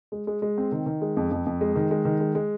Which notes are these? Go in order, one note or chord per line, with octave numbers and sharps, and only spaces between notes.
G#3
G#3
G#3
C4
D#3
D#3
G#3
F2
F2
F2
G#3
D#3
G#3
D#3
G#3
G#3